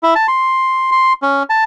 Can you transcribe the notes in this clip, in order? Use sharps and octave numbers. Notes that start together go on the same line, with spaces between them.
E4
A5
C6
C6
C#4
A5